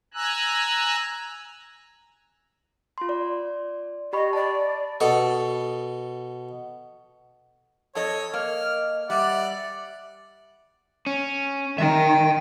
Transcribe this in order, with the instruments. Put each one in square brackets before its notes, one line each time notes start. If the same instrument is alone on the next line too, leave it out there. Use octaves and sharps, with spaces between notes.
[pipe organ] G#5 A#5 E6 F#6
[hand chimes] F4 C6
D5
[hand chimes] G4 B5 C#6 [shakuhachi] D#5
[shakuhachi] D5 [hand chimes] A5
[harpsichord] B2 A4
[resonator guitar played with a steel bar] F2 A4 D#5 [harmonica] C#5
[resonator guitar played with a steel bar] A#3 [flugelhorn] D#5 [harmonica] F6
[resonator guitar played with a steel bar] G3 [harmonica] D5 F#5 [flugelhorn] E5
[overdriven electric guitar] C#4
[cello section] D#3 [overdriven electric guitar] E5 G5